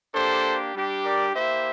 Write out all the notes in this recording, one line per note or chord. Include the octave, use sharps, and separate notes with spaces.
A#3 D4 G4 A4 C5
G3 D4 G4
A#4 D5
A#3 E4 G4 C5 E5